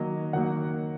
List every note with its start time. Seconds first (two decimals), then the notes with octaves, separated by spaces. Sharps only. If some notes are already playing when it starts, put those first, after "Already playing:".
Already playing: D#3 F#3 A#3 D#5
0.33 D#3 F#3 A#3 F#5